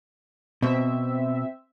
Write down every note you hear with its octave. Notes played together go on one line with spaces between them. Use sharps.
B2 C4 E5